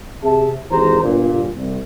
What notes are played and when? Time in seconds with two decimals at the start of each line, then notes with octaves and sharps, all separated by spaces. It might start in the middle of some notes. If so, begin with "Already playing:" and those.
0.23 C3 G#4 E5 A5
0.71 G#1 E3 G4 G#4 C5 A#5
1.02 G1 A#2
1.56 C2